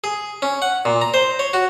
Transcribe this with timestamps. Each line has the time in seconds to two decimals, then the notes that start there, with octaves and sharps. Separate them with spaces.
0.04 G#4
0.42 C#4
0.62 F#5
0.85 A#2
1.02 A#5
1.14 C5
1.39 C#5
1.53 F#4